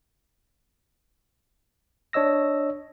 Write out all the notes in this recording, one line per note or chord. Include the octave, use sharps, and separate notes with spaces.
D4 C#5 D#5 E6 A#6